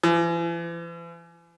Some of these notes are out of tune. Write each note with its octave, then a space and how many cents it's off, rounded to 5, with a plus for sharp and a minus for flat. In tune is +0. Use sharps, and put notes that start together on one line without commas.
E3 +40